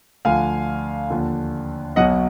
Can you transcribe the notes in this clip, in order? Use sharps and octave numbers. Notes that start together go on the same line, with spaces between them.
D2 D3 F3 F5 G#5
D#2 D3 F3
B1 B2 F#3 D#5 F#5